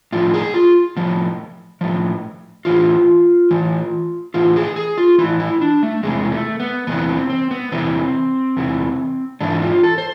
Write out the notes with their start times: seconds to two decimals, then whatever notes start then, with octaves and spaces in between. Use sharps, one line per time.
0.12 A2 F3 F4
0.34 G#4
0.54 F4
0.97 A2 F3
1.81 A2 F3
2.65 A2 E3 F4
3.51 A2 E3
4.34 A2 E3 F4
4.56 G#4
4.76 G#4
4.98 F4
5.18 A2 E3 E4
5.40 E4
5.61 D4
5.83 A3
6.03 E2 C3 E3 G#3
6.25 B3
6.32 A3
6.60 B3
6.87 E2 C3 E3 B3
7.08 C4
7.30 C4
7.51 B3
7.72 E2 C3 E3 C4
8.57 E2 C3 E3
9.41 G#2 E3 D4
9.62 F4
9.83 A4
9.98 C5